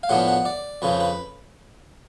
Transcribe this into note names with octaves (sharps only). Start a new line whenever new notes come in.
F5
A2 F3 G#3 B3 D4 F#5
F#5
D5
F2 C#3 F3 B4
B4